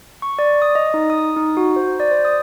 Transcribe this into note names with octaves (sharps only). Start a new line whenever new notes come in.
C#6
D5
D#6
D#5
D#4
D#6
D#4
F#4
C5
D5
C5
D#6